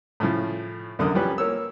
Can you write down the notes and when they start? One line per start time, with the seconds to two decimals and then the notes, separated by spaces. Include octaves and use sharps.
0.20 A2 C#3 F3
0.99 C2 F#2 D3 A#4 D#6
1.15 F3 G3 C#4 B4
1.38 A#3 C#5 E6